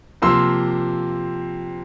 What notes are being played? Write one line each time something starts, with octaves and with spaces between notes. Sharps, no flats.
C3 F3 A#3 C6 E6